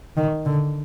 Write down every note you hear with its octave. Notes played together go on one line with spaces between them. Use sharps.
D#3
D3